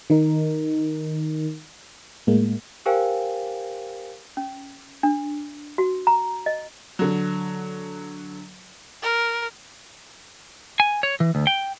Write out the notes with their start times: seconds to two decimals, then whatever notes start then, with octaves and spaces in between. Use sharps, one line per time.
0.10 D#3 D#4 A#4
2.27 A2 G#3 A#3
2.86 G4 A#4 C5 F5 G5 G#5
4.37 C#4
5.03 D4
5.78 F#4
6.07 A#5
6.46 D#5
6.99 D3 F#3
9.02 A#4
10.80 G#5
11.03 C#5
11.20 E3
11.35 D2
11.47 G5